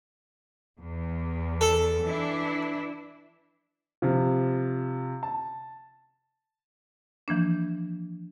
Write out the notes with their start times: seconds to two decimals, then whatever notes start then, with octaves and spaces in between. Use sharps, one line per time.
0.78 E2
1.61 A4
2.04 E3 D4 E4
4.02 C3 F3
5.23 A5
7.28 E3 F3 A#3 D4